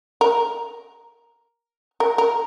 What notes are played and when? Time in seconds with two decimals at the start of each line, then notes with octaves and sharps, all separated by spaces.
0.21 A#4
2.00 A#4
2.18 A#4